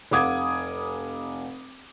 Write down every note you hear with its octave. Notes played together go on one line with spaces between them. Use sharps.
F1 F5 F#5 D6 D#6 G#6